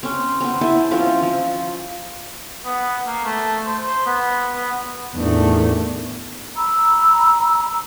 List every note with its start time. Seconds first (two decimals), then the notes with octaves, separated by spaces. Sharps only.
0.03 C4 C#4
0.40 B3 C4
0.61 E4 C5 G#5 A5
0.91 F3 C4 C#4
1.23 F3
2.65 B3
3.07 A#3
3.24 A3
3.65 C5
3.86 C5
4.06 B3
4.55 B3
5.15 E2 A2 D#3 A3 D4
6.57 A#5 B5 E6